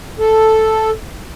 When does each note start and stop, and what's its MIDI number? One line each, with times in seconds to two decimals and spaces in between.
0.19 0.90 69